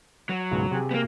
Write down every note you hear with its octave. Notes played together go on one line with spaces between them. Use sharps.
F#3
C#2 G#2 B2
C3 G4 G#4
A#3 B3